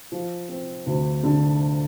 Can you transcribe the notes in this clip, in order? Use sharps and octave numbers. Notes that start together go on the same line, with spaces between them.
F3
C4
D2
D3